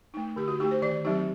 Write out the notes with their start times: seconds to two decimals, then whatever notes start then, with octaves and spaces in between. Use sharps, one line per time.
0.14 A3 D#4
0.36 D3 G4
0.48 F#4
0.60 D#4 G4
0.64 A3
0.71 C5
0.82 D#3 D5
1.05 F#3 C4 D#4 G4